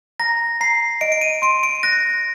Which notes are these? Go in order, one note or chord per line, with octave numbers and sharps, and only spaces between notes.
A#5 A#6
A#5 C7
D#5 D7
D7
D#7
C6 D7
D7
F#6 A#6